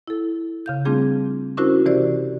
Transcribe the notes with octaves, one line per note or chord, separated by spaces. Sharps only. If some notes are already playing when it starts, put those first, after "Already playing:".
E4 A4
C#3 F5 G6
G3 A3 C4 D4 F4 G#4
C#4 D4 E4 F#4 A#4 C5
C3 E3 G4 C5 D5 E6